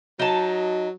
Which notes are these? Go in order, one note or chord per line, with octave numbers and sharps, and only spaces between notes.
F#3 D#4 A5